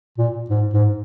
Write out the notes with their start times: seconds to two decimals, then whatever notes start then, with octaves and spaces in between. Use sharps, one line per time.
0.18 A#2
0.50 G#2
0.73 G#2